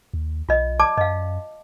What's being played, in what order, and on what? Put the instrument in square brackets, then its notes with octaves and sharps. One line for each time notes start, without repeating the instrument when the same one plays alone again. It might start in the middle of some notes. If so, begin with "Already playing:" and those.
[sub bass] D#2
[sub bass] B1 [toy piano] F4 D#5
[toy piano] D5 A5 D6
[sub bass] F#2 [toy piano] D#5 F5